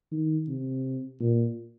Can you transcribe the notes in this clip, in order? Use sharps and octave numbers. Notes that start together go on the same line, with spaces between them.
D#3
C3
A#2